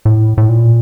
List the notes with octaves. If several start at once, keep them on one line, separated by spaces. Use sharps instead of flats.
A2
A2
A#2